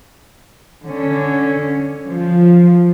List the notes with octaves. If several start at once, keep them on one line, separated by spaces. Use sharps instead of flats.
D3 C#4
F3